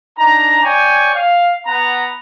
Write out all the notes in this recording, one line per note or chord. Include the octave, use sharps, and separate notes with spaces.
D4 D#4 A#5
C#5 D5 G5 G#5
F5
B3 F#5 A#5